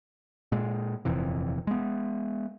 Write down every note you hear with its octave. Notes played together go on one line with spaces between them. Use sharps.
A#2 G#3
D#1 F2 C3 E3
G#3 B3